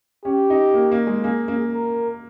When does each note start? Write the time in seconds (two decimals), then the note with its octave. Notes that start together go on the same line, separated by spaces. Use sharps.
0.25 C#4 G4
0.50 D#4
0.74 A#3
0.92 A#3
1.07 G#3
1.24 A#3 G#4
1.48 A#3
1.74 A#4